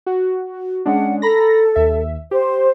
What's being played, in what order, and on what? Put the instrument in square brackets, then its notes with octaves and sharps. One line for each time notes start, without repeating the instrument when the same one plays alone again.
[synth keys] F#4
[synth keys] G#3 C#4 D4 [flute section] F#5
[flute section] A4 [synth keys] A#5 B5 A#6
[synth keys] D#2 E5
[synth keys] G4 [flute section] C5